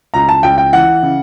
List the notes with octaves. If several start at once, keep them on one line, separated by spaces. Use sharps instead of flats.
C#2 A#5
A5
C#2 G5
G5
E3 F#5
C#3